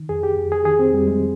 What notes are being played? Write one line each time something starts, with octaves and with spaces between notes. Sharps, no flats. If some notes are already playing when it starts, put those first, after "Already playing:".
Already playing: D#3
F2 G#4
G4
F2
G#4
D#3 G#4
C4
F2 G3
G#3